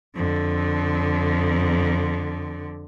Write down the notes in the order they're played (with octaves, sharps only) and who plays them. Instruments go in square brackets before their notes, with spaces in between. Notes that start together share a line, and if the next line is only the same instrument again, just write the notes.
[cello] F2 D3